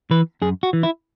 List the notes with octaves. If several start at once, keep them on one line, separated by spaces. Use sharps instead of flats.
E3 B4
F#2 G#4
F#4
E3
E4